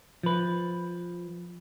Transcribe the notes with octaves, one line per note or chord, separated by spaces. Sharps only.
F3 B4